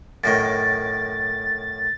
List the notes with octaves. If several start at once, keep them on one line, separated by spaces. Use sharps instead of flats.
F#2 A2 D#3 A6